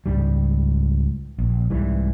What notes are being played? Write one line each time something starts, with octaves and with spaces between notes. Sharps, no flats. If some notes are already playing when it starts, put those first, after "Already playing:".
C#2 G#2 G3
A#1
C2 G#2 E3 G3